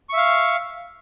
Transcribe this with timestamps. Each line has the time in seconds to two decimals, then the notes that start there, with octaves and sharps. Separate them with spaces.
0.09 C#6
0.13 E5
0.17 F5